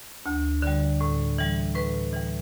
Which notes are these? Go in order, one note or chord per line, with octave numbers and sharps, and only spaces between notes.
D2
D3 G3
A2
E3 G3
A2 B4
E3 G3